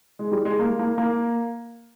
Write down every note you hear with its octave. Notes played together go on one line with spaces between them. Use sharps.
G#3
G3
G#3
A#3
A#3
A#3